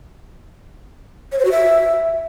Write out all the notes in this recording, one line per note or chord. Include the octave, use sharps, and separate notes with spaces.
C#5
C5
F#4
E5